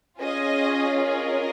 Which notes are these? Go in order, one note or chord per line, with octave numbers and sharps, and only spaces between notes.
C#4 F4 G#4 D#5 G#5
A#4 D#5